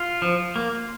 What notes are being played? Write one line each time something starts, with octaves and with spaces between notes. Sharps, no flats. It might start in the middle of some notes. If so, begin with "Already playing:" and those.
Already playing: F4
F3
A#3